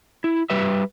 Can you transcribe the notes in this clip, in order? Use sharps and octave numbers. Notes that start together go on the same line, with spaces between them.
E4
G3 B4 E5